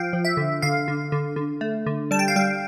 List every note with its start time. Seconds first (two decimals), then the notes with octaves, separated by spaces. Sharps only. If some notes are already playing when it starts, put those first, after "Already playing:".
Already playing: F3 F5 G5
0.13 F3
0.25 E5
0.37 D3
0.62 D3 F5
0.88 D3
1.12 D3
1.36 D3
1.61 A3
1.86 D3
2.11 G3 A5
2.19 G5
2.28 F5
2.36 G3 G5